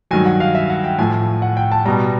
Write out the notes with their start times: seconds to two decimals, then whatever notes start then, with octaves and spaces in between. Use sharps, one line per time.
0.11 G2 D#3 F#3 G#5
0.26 F#5
0.40 F5
0.55 E5
0.70 F#5
0.84 G5
0.98 A2 F3 G#5
1.42 F#5
1.57 G5
1.72 A5
1.85 B2 G3 A#5